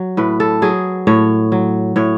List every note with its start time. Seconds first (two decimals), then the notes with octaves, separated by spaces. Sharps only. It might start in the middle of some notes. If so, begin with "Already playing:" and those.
Already playing: F#3
0.17 A2 B4
0.40 A4
0.62 F#3 G#4
1.07 A2 C#5
1.52 F#3
1.96 A2 C#5